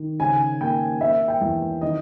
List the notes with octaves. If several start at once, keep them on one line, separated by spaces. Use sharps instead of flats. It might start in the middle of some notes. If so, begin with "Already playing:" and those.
Already playing: D#3
C#3 G#5
A#3 G5
A#3 E5
G5
E2
D#3 D#5